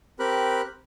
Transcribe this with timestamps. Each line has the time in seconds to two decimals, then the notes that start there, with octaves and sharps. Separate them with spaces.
0.19 C4 G4 A#4 B5 F#6